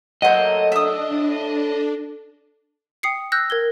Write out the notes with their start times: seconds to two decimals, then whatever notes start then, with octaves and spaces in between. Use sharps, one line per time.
0.22 F#3 A3 A#3 C5 D#5 F#5
0.72 D4 E5 D#6
1.11 A2
3.03 G5 D#6 C7 C#7
3.32 E6 F#6 G6 A#6
3.50 A#4 G#6 G7